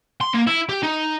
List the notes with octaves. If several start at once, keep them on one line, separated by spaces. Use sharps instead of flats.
C6
A#3
E4
G4
D#4